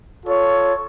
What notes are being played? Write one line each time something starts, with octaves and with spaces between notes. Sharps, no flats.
F4 A4 C#5